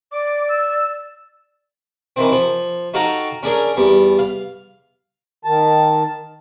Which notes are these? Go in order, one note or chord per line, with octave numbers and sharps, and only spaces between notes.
D5 D6
E6
D#3 E3 C4
F3
D#4 F#4 A4 F5 G5 A#5
C#4 D4 G#4 A#4
E2 G3
F5
D#3 A5